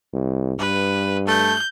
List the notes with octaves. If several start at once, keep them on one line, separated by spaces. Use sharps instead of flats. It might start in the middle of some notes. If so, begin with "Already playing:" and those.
C2
G2 B4
A3 G6